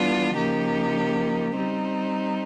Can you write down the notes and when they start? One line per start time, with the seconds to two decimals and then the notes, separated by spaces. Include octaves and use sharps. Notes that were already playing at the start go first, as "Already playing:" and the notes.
Already playing: E3 G3 B3 D4 F4
0.34 C#3 F3 A#3 D#4 G4
1.55 G3 C4 D#4